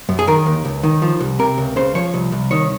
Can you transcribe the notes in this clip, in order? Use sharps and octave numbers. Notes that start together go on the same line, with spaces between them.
F#2
G#4
D#3 A#4
D#2
C#2
D#3
F3
C2
C3 A#4
C#2
C#3 C5
F3 C#5
C2
C2
D#3 C#5